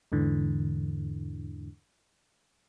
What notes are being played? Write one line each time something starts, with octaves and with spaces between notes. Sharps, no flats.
E2 G#2 D3 E3